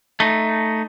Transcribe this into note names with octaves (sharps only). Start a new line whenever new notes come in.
A3 D#4